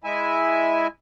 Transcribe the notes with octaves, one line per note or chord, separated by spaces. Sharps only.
G#3 E4 E5 G#5